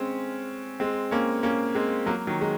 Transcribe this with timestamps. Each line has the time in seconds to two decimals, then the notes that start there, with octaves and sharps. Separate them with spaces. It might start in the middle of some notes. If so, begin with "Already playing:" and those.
Already playing: G#3 C4 C#4
0.80 G#3 C4
1.11 A#3 C#4
1.43 A#3 C#4
1.75 G#3 C4
2.06 F#3 A#3
2.27 D#3 F#3
2.41 G#3